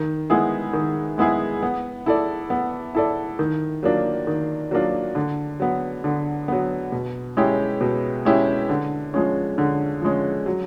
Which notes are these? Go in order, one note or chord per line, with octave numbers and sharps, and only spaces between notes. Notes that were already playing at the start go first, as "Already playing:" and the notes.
Already playing: D#3
G#3 B3 E4 G#4
D#3
G#3 B3 E4 G#4
B3
E4 A4 D5
B3
E4 A4 D5
D#3
F#3 A#3 D4 F4
D#3
F#3 A#3 D4 F4
D3
F#3 B3
D3
F#3 B3
B2
G#3 C#4 E4 G4
B2
G#3 C#4 E4 G4
D3
F3 G#3 C#4
D3
F3 G#3 C#4
F#3